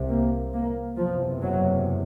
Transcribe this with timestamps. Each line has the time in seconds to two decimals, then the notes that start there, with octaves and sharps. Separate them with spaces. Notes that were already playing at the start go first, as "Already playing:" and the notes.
Already playing: C2 C3
0.09 A#3
0.53 A#3
0.97 F#1 E2 C3 F3
1.41 F#3